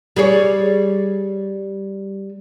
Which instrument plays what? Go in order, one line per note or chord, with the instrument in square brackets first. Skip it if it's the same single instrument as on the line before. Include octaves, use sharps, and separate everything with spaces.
[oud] G3 G#4 C#5